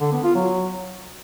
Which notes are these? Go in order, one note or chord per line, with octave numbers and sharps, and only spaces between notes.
D3
B3
F4
F#3